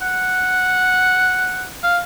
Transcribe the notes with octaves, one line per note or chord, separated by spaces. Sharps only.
F#5
F5